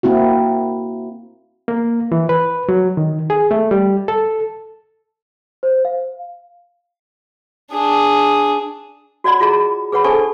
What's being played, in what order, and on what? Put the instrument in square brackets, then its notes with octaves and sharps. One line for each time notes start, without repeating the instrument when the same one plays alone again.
[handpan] A#3 C4 E4 F#4
[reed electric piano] A#3
E3
B4
F#3
D#3
G#4
A3
G3
A4
[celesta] C5
F5
[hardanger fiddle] D4 G#4
[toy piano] F#4 C#5 D5 F#5 B5
F4 F#4 G#4 D#5 A#5
G#4 B4 C#5 F#5 B5
D4 A4 C5 G#5 A5 C#6